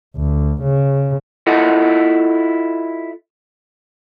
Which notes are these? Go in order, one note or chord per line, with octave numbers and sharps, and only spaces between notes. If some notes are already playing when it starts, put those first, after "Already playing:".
D2
C#3
E4 F4 A4 D#5 F#5